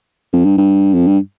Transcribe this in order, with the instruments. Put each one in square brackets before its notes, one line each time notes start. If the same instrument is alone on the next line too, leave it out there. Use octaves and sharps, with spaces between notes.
[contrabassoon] F2
G2
G2
F2
G2